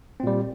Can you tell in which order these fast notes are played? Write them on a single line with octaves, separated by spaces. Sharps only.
C4 A#2 G3